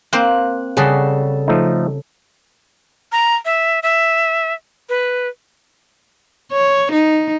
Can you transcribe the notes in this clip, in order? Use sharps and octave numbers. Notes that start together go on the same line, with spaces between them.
A#3 C4 C5 F#6
C#3 G3 F#4 G#4 A4 C7
F3 A3 D#4
A#5
E5
E5
B4
C#5
D#4